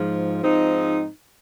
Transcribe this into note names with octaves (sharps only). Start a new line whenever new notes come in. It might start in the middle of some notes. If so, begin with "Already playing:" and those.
Already playing: G#2 F3
G#2 F3 C4 D#4